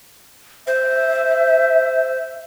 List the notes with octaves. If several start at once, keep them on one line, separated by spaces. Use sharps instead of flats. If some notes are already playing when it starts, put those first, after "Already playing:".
C5 E5